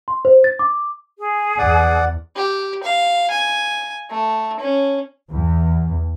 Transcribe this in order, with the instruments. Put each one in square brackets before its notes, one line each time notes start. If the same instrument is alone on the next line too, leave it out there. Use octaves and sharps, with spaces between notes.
[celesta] C6
C5
A6
D6
[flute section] G#4
[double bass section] E2 [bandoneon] D5 F#5
[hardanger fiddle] G4
F5
G#5
A3
C#4
[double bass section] E2